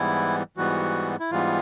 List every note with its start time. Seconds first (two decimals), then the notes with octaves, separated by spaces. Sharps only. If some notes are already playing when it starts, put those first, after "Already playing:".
Already playing: G#2 E3 G3 B3 E4
0.57 G#2 E3 G3 B3 F#4
1.20 E4
1.31 G#2 E3 G3 B3 F4